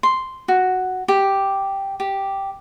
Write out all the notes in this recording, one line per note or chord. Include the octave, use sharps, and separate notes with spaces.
C6
F#4
G4
G4